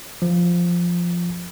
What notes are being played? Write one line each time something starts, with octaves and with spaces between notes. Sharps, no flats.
F3